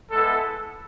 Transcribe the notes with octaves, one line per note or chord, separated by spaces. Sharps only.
G#3 B3 E4 A4